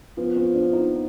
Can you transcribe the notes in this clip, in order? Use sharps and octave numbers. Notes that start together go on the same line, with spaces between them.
F3 B3
C4
D4
D#4